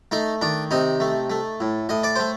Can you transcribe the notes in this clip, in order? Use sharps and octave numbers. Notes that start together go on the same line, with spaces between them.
A3 D#4
D#3 D4
C3 D#4
A3
A3
A2
A2 D#5
D5
A3 C5